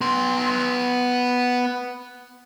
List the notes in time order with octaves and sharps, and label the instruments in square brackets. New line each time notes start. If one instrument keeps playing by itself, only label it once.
[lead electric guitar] B3 C6